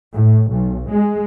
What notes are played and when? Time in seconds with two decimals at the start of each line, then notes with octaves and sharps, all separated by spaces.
0.14 A2
0.51 B1
0.92 G#3